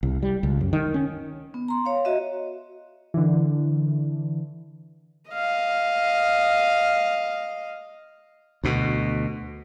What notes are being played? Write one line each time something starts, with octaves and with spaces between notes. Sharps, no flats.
C2
G3
C#2
F#2
D#3
C#4
B3
A#5 C6
C#5 F5
F#4 D#5 E5
D3 E3
D#5 F5
D2 B2